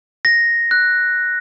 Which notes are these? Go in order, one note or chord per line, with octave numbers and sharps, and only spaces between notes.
A#6
F#6